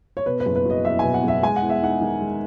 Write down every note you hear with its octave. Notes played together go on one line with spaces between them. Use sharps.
C#5
B2 B4
B4
F#1
B4
F#3 D#5
E2 E5
B2 G#5
F#5
F#1 E5
G#3 G#5
F#5
E2
E5
D#4 F#5
D#3
G#3